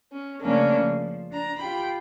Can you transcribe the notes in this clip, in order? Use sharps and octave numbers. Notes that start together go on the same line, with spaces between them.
C#4
C#3 F3 A3 A#3 C#4 D4
F3
D4 A#5
F4 G4 G5 B5